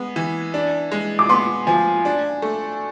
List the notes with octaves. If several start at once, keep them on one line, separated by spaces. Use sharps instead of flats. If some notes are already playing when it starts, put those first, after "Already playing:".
Already playing: G#3 B3
E3
D4
G#3
D6
B3 C6
F3 G#5
D4
A3